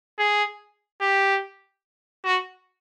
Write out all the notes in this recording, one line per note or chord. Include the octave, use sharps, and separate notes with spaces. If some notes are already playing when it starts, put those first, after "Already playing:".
G#4
G4
F#4